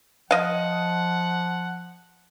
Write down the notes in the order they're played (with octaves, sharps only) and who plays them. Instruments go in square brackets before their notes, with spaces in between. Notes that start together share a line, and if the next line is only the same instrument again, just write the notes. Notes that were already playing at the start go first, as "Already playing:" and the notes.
[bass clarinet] F3 [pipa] D#5 F5 [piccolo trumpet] F#5